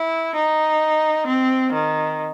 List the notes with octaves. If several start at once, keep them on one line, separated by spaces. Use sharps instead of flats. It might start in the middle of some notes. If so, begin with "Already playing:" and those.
Already playing: E4
D#4
C4
D#3